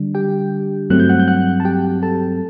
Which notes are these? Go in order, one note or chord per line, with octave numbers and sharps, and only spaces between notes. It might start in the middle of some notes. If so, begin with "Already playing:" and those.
Already playing: D3 G3 D4
G4 G5
G2 F#3 A3 C4 F#6
G6
F#5 F#6
G6
F#5 F#6
A5
G4 G5
A4 A5